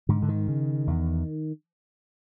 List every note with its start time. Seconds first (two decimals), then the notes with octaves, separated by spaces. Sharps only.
0.09 G#2 D3
0.22 D3
0.28 D#3
0.48 C#3
0.87 E2